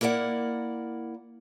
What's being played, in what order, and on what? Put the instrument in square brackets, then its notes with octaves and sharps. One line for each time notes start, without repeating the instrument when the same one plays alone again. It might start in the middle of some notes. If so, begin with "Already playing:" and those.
[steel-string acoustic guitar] A#3 E4 A#4 D5 F#5